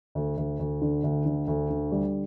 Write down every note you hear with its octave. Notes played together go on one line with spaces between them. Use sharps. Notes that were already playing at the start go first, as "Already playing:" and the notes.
D2
D2
D2
D3
D2
D3
D2
D3
G3